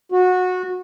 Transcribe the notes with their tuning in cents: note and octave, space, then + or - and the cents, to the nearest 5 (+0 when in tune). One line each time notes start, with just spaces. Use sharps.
F#4 -20